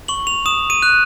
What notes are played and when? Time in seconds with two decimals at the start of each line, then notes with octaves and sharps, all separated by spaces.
0.08 C#6 F#7
0.27 F7
0.46 D#6 E7
0.70 D#7
0.82 F#6